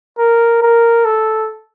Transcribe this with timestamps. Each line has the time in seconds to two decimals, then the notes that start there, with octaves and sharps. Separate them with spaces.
0.18 A#4
0.62 A#4
1.05 A4